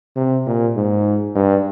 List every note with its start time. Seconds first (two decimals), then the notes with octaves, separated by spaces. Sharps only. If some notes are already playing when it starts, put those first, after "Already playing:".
0.16 C3
0.47 A#2
0.76 G#2
1.35 G2